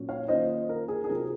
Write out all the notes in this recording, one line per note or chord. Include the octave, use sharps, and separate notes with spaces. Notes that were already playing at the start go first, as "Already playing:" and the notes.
Already playing: A#2 F#3 C#4
C#5 F5
D#3 A#3 C#4 F4 C5 D#5
A#4
G#4
G#4
C3 F#3 C4 F4 A#4